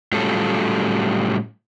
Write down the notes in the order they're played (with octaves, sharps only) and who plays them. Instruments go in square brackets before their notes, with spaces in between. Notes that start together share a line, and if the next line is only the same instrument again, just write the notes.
[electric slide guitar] A2 F#3 G3 C#4 F4 A4